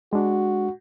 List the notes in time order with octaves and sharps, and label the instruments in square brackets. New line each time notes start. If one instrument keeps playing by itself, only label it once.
[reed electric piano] G#3 D4 [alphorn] F#4